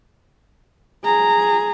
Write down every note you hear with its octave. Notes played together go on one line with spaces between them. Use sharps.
G#4 A#5